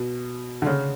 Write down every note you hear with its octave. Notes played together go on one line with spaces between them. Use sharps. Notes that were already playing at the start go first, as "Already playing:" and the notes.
Already playing: B2
D3
C#3